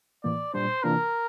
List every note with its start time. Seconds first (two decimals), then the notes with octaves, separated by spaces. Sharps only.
0.24 A2 E3 A#3 D5
0.54 A#2 G3 D4 C5
0.83 C3 E3 A#3 D4 F4 A#4